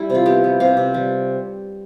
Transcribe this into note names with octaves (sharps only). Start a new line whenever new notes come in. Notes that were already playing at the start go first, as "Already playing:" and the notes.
Already playing: G3 E4
C3 F4
B3 G4
B3
C3 F5
C3
G3